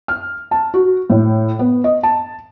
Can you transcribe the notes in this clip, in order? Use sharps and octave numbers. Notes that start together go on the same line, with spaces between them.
F6
A5
F#4
A2
B3
D#5
A5